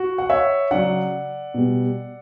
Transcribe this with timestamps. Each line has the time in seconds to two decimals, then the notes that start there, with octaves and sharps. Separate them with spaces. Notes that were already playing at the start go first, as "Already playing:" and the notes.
Already playing: F#4
0.18 F#5
0.30 C#5 E5
0.71 C#3 F#3 D5 F#5
1.54 B2 G3